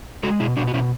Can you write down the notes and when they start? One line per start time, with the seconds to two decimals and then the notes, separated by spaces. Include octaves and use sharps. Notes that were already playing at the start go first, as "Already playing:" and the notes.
0.23 G#3 F#4 A4
0.40 B2 E4 G#4
0.57 B2 D4 F#4
0.67 F#4
0.73 B2 C#4 E4